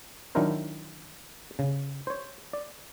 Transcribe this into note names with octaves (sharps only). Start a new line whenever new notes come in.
D#3 F#3 D4 E4 A#4 C5
C#3
C5 C#5
D5